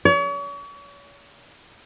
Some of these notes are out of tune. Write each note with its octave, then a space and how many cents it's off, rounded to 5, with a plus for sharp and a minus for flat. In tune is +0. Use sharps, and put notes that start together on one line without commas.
C#5 +40